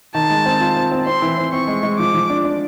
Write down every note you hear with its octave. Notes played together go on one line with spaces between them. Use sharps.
D#3 A5
G#3
C4
F4
C4
C4
C4 C6
E3
C4
C4 C#6
G#3
G#3
F3 D6
F3
D4
D4